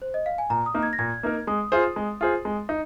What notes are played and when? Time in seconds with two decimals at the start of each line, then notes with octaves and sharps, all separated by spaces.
0.02 C5
0.14 D#5
0.26 F5
0.38 G#5
0.50 A#2 A#5
0.66 D#6
0.74 A#3 D#4 A#4
0.83 G#6
0.93 A#6
0.99 A#2 G#6
1.23 A#3 D#4 A#4
1.47 G#3 D#6
1.72 F4 G#4 C5
1.96 G#3
2.21 F4 G#4 C5
2.45 G#3
2.69 D#4